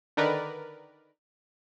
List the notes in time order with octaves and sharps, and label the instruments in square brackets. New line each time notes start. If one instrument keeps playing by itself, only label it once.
[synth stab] D3 D#3 A#4 B4 D5